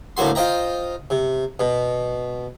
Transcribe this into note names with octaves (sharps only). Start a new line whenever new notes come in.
D2 A2 A#3 F#4 C6
F4 C5 D#5 G5 A#5
C3
B2